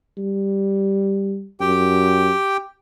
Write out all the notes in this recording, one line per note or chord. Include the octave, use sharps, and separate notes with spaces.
G3
F#2 G4 G5